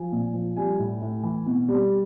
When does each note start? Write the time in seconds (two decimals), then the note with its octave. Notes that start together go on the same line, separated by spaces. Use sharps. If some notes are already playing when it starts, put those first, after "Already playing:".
Already playing: F3 G#5
0.12 A#2
0.34 F3
0.57 G3 G#5
0.79 A2
1.02 A2
1.23 E3
1.46 B2
1.69 G3